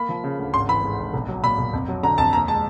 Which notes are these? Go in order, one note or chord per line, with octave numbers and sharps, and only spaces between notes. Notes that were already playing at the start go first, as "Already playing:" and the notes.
Already playing: A#3 B5
F3
C#3
D2
G#1 C6
E3 B5
G#2
G#1
B1
F#3
A#2 B5
B1
F2
F#3
D3 A#5
F2 A5
D#2 A#5
G#3 A5